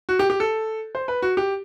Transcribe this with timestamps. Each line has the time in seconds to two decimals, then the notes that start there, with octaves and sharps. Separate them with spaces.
0.09 F#4
0.19 G4
0.30 G4
0.40 A4
0.95 C5
1.08 B4
1.22 F#4
1.37 G4